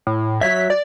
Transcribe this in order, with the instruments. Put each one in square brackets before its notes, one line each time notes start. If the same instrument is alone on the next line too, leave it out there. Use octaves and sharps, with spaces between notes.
[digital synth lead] A2
[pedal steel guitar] F#3 C#5 E5 [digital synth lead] B6
[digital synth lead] D5